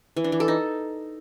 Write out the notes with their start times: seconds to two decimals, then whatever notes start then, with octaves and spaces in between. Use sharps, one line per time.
0.17 E3
0.24 D4
0.32 E3
0.40 A4
0.48 D#4